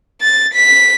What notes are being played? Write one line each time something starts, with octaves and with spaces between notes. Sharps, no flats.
A6
B6